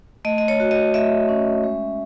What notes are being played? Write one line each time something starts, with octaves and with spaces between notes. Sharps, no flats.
A3 D#5
D#5
C#5
F#4
D#5
A3 E5
C#4
G#3